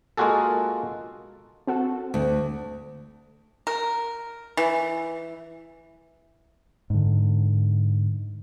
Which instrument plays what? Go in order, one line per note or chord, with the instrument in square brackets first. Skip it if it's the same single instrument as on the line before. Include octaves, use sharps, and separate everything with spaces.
[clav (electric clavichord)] G#3 A#3 F4 F#4 G#4 A4
[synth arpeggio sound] C4 F#4 A4
[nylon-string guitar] D2
[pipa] A#4
E3
[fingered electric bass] G#2 D3